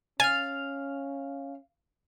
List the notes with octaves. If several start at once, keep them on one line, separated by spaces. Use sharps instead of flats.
C#4 F5 G#5 F6 A6